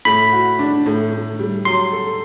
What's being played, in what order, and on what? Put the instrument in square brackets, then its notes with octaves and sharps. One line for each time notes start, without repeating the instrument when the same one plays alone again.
[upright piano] A2 [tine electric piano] B5
[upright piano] F#4
D4
A2
A2
G3
[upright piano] F#3 [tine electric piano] C6
[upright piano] A4